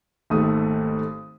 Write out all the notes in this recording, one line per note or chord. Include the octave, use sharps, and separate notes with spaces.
G#1 D#2 A3 A4 D#6